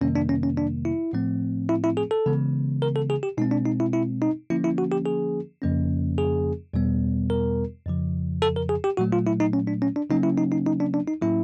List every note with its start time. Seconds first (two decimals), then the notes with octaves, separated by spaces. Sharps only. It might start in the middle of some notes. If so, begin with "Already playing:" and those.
0.01 F2 C3 D#3 G3 A#3 C#4
0.15 D4
0.29 C#4
0.43 C#4
0.57 D4
0.85 E4
1.13 A2 F3 A3 C4
1.69 E4
1.84 E4
1.97 G#4
2.11 A4
2.26 C#3 E3 G#3 B3
2.82 A#4
2.96 A4
3.10 G#4
3.23 G4
3.38 B2 G#3 C4 D#4
3.51 D4
3.65 D#4
3.80 E4
3.93 E4
4.22 D#4
4.50 D3 F3 A#3 C#4 E4
4.64 E4
4.78 F#4
4.92 G4
5.06 G#4
5.62 F2 C#3 F3 A#3 C#4
6.18 G#4
6.74 E2 B2 G3 B3
7.30 A#4
7.86 F2 C#3 F3
8.42 A4
8.56 A#4
8.69 G#4
8.84 G4
8.97 A#2 F#3 A3 F#4
9.12 F4
9.27 E4
9.40 D#4
9.53 C#4
9.67 D4
9.82 C#4
9.96 D4
10.09 C#3 F#3 A#3 C#4 D#4
10.23 E4
10.37 D#4
10.52 D#4
10.66 D#4
10.80 D4
10.94 D4
11.07 D#4
11.22 A2 F#3 A#3 C#4 E4